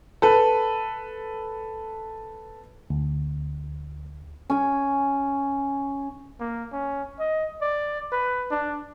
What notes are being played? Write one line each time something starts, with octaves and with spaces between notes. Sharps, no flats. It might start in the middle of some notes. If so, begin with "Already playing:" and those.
A4 B4
D2
C#4 G#5
A#3
C#4
D#5
D5
B4
D4